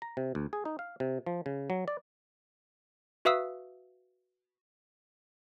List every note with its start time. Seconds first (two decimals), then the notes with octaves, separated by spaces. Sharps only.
0.02 A#5
0.17 C3
0.35 D2
0.53 G#4
0.65 D#4
0.79 F5
1.00 C3
1.26 F3
1.46 C#3
1.70 F#3
1.88 D5
3.25 F#4 B4 E5 F5 D#6 E6